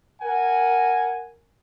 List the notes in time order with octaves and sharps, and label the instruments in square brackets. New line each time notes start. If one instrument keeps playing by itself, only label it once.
[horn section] A#4 F#5 G#5